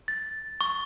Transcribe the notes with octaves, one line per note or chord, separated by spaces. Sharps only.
A6
C#6